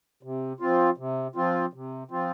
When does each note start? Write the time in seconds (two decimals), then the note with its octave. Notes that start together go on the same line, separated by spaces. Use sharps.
0.23 C3
0.60 F3 C4 F4
0.97 C3
1.35 F3 C4 F4
1.73 C3
2.11 F3 C4 F4